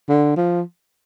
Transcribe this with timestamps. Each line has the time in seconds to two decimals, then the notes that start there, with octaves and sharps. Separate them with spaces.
0.09 D3
0.36 F3